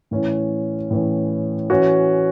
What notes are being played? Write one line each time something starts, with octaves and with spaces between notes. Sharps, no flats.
A2 E3 C#4
A2 E3 C#4
E3 C#4 F#4